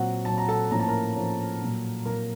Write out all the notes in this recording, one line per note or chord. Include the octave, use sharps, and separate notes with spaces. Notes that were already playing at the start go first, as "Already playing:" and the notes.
Already playing: A#2 F#3 C4 F#4 F#5
A#2 F#3 C4 A5
A#5
A4 A5
A2 F3 A#3 C#4 A#5
A5
A#4 A#5
A2 F3 A#3 C#4
A#2 F#3 A#3
A#2 F#3 A#3 A#4 A#5